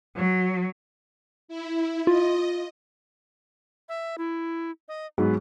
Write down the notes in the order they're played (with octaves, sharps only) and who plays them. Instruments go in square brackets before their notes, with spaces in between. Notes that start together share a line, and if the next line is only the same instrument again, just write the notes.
[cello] F#3
[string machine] E4
[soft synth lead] F4 [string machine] D#5
[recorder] E5
E4
D#5
[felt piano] G#2 F#3 G#3 [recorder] B3